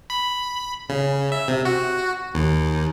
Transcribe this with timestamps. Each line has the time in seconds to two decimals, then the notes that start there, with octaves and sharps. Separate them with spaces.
0.10 B5
0.89 C#3
1.32 E5
1.48 C3
1.65 F#4
2.34 D#2